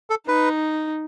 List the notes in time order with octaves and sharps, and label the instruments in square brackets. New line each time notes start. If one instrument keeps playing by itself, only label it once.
[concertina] A4
[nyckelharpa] D#4 [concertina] B4